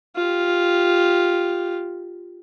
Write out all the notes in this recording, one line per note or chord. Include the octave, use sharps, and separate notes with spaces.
F4 G4